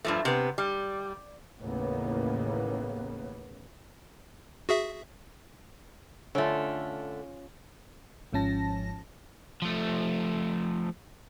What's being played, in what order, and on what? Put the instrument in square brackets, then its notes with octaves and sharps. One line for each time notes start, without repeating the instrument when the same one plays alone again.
[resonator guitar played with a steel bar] G2 F3 A3
C3 B3
G3
[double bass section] A1 D#2 A2 C#3 A#3 B3
[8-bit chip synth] F#4 G#4 E5
[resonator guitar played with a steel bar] D3 A3 [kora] C#4 F4
[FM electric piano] G#1 G#2 F3 C#4 A5 A#6
[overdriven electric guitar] F3 A3